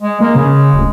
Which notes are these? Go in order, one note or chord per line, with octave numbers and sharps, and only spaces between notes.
G#3
G#3 A#3
C#3
D1